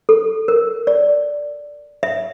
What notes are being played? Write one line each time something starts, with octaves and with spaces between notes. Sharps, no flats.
A4
A#4
D5
E5